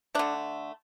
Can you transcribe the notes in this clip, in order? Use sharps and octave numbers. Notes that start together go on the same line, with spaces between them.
D3 A3 D4